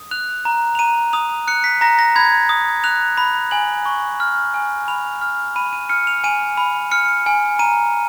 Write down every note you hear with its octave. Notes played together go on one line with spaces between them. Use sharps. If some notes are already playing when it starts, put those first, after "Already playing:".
Already playing: D#6
F#6 F7
A#5
F7
A#5 D#7
D#6 F7
F#6 C#7
B6
A#5 A#6
A#6
B5 G#6
D#6
F#6 F7
B5
G#5 F#7
C#6
F6
G#5
B5 F7
F6
B5 D#7
D#7
F6 C#7
F7
G#5 D#7
B5
F6 C#7
G#5
A#5 D#7